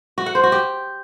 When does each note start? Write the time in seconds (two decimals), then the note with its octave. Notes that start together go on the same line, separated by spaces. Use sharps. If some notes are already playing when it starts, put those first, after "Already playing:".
0.18 F#4
0.26 F#5
0.35 C5
0.43 F#4
0.52 G4